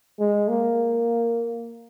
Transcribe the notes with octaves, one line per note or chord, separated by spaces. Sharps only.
G#3
A#3